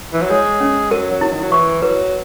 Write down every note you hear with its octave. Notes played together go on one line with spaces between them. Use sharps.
E3
F#3
G#3 C#5
C#4
F#3 A#4
F#3
E4
D#3
F#3
E3 C#6
F#3 B4